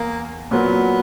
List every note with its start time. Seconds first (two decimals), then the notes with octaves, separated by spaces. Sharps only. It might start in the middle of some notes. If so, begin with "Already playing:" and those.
Already playing: E2 A#3
0.51 A#2 F#3 A#3 B3